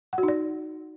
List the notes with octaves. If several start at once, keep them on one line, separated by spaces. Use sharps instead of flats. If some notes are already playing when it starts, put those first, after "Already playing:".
F#5
F#4
D#4
D5